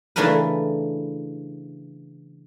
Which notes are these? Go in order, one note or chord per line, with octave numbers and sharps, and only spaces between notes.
C#3 E3 A3 D4 A#4 B4